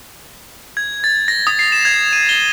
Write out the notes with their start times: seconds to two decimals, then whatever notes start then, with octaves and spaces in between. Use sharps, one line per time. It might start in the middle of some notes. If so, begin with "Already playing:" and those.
0.77 G#6
1.04 A6
1.28 A#6
1.47 D#6
1.59 C7
1.72 E7
1.85 G#6
2.13 D#7
2.29 G7